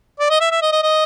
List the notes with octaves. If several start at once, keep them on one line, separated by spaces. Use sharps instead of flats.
D5
D#5
E5
E5
D#5
D#5
D#5